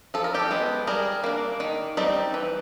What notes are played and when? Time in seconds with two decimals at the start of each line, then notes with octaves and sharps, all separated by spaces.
0.14 F3 A4
0.24 A#4
0.34 G4 A4
0.51 G#3 B3
0.87 G3 G#4 A#4
1.24 A#3 D4
1.60 D#3
1.97 G3 C4 D#4
2.34 E3